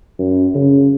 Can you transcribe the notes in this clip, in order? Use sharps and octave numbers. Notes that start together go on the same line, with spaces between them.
F#2
C#3